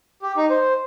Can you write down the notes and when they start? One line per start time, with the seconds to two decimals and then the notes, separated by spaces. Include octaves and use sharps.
0.22 G4
0.37 D#4
0.50 C5